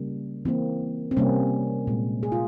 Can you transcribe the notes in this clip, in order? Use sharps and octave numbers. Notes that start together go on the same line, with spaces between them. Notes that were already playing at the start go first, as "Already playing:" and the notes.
Already playing: C#3 G3 A#3
E3 A#3 C4
C4
C3 G3 A#3 C#4
A#2 G#3
G#4
F4